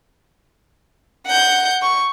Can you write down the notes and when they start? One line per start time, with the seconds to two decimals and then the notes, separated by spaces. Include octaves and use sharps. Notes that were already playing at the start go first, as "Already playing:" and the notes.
1.27 F#5 G6
1.82 C#6